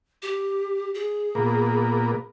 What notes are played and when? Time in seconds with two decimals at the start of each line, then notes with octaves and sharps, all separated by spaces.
0.22 G4
0.94 G#4
1.35 A#2 A#3 B3